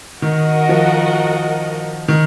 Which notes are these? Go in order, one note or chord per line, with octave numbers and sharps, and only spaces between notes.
D#3 F#4 A#4 D#5 F#5
F3
D#3